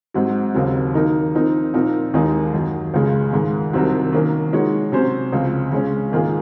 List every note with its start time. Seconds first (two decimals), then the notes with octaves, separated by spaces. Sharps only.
0.14 G#2 F#3 C4 F#4
0.54 D#2 C#3 F#3 C4
0.94 D#3 A#3 D#4 A#4
1.34 F3 C4 D#4 A#4
1.74 A#2 F3 C4 D#4 A#4
2.14 D#2 D#3 G#3 D#4 G#4
2.54 F#2 D#3 F#3
2.94 C#2 C#3 G#3
3.33 G#2 D#3 G#3
3.73 C2 C3 D#3 F#3 C4
4.13 D#3 A#3 C#4
4.52 F3 G#3 D#4 F#4 C#5
4.92 C3 F#3 C#4 F#4 C5
5.32 C#2 C#3 F3 C4
5.72 C#3 G#3 C#4
6.12 G#2 D#3 A#3 F4 G#4